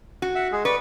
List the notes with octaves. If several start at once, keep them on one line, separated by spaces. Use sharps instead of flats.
F#4
E5 F#5
G#3 G#4
B4 D5 C#6